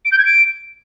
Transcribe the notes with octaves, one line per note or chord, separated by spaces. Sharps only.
D7
G6
G#6
D7